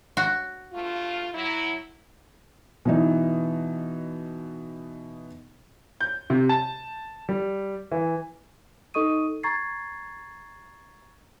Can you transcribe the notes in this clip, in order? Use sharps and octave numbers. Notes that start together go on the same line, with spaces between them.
F#4
G2 A3 F4
F#3 E4
B2 E3 D#4
G6
C3
A5
G3
E3
D#4 A4 D#5 C#6 D#6 D#7
A#5 C#6 G#6 A6 C7